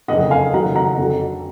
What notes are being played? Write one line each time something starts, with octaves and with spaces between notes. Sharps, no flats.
F#1 F2 D3 D#5 F#5
F5 G#5
F#1 F2 D#3 F#3 F#5 A#5
F#5 A#5
F2 D3 F#3